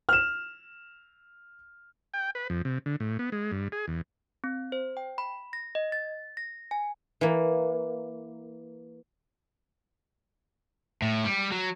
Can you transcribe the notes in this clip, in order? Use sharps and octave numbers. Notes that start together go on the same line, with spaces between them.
F6 E7
G5
B4
F2
C3
D3
A2
B3
G#3
G2
G#4
E2
C4
C5
G5
B5
A#6
D#5
A6
A#6
G#5
E3 A#3
A2
G3
F#3